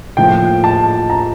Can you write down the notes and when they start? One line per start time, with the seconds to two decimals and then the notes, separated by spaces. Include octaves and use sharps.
0.17 A2 F3 A#3 G5
0.64 A5
1.10 A#5